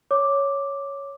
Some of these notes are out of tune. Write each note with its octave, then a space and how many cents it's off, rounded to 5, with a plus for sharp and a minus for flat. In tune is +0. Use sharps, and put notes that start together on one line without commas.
C#5 +0 D6 +0